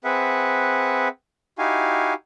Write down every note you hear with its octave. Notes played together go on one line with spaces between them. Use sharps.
C4 G#4 B4 E5 F#5
D#4 E4 F#4 G4 F5 G#5